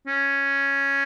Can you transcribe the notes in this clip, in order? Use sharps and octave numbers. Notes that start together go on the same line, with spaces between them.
C#4